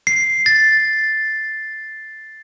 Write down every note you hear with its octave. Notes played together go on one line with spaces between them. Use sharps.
C7
A6